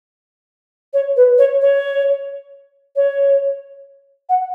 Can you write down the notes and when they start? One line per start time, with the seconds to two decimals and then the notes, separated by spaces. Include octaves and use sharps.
0.93 C#5
1.16 B4
1.38 C#5
1.61 C#5
2.96 C#5
4.29 F#5